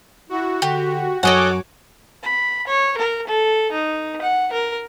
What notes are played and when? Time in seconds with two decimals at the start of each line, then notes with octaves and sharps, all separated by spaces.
0.30 E4 F#4
0.62 D3 G4
1.23 F#2 F#4 A4 C#5 D#5 F#5 G#5 D6
2.23 B5
2.67 C#5
2.97 A#4
3.27 A4
3.72 D#4
4.21 F#5
4.52 A#4